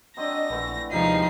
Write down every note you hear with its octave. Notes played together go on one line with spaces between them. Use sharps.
F#3 C4 D4 D#5 A#6
A#1 D3 E3 A3
D#2 C3 F3 G#3 D#4 G4 D5 C7